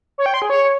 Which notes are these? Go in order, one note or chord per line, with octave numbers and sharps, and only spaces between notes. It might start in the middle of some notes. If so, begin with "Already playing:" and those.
C#5
G5
C6
G#4
C#5